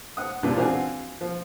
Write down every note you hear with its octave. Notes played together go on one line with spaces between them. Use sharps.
F#5 D#6
E2 G2 A#2 E3 D4
E3 C4 D4 F4 F#4 G#4
F3